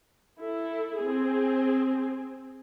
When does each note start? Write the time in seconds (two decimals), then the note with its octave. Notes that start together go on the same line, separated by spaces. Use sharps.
0.40 E4 A4
0.99 C4 G#4